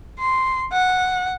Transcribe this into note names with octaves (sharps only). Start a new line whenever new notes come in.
C6
F#5